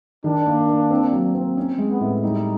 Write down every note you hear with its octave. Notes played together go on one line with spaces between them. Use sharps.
D#3 D4
A#3
A#3
C4
F#3
C4
C#4
G#3
B3
A2
G3 D#4